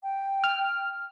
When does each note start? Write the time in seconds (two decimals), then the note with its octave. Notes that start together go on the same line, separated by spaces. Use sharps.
0.03 G5
0.44 F6